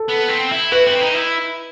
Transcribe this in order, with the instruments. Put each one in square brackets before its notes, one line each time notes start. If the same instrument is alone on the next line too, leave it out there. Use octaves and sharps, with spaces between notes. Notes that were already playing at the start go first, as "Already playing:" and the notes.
Already playing: [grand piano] A4
[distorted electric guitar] B3
C4
E4
[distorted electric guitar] F#4 [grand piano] B4
[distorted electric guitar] C4
D#4
E4